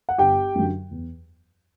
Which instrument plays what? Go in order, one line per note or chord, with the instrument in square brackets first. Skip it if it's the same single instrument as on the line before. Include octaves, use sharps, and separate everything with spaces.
[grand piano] F#5
G1 G4 G5
F#2 D3 F#3
E2